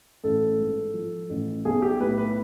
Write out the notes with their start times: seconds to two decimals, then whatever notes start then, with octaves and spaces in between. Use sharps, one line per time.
0.24 A1 A4
0.58 G#2
0.94 F3
1.30 A1
1.65 B1 G#4
1.82 G4
2.01 A2 B4
2.18 B4